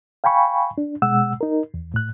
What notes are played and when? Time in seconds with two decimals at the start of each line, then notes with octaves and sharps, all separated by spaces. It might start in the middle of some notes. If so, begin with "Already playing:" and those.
0.24 F5 G5 G#5 B5 C#6
0.78 D4
1.02 B2 G#3 F#5 E6
1.41 D#4 A#4
1.74 E2
1.94 A2 F#6